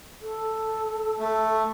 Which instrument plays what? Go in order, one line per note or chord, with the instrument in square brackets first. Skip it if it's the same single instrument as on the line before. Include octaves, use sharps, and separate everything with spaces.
[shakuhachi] A4
[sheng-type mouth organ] A3